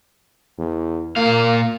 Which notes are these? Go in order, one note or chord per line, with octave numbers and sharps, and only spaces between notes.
E2
A#2 A#3 F5